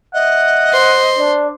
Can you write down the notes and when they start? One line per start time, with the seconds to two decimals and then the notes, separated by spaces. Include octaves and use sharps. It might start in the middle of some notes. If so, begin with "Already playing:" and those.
0.14 D#5 E5 F#5
0.73 C5
1.18 D4 D5